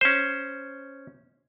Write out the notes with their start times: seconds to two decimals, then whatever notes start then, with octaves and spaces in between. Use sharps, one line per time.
0.01 C#4 C5